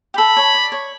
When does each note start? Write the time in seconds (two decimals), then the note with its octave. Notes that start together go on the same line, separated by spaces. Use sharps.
0.14 G4
0.18 A4 B5
0.37 C#5
0.55 D5
0.72 C#5